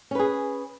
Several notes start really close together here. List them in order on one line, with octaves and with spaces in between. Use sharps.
C#4 B4 G#4